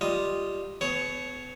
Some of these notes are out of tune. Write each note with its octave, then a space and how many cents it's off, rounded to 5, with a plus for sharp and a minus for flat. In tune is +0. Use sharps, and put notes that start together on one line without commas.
G3 +0 F4 +0 D#5 +0
B3 +40 A4 -45 C#5 +0